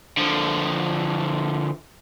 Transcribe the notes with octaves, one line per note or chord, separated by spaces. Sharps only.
D3 F3